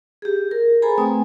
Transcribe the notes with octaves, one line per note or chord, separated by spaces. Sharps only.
G4 G#4
A#4
G#4 A4 C5 G#5 A#5 B5
A3 C4 B4 G5 G#5 D#6